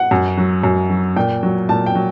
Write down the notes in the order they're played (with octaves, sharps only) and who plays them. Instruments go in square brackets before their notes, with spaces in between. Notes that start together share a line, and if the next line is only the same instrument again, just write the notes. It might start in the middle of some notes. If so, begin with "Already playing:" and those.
Already playing: [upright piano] F#5
F#2
F#3
F#2
F#3
A#2 G5
F#3
A#2 A5
G5
F#3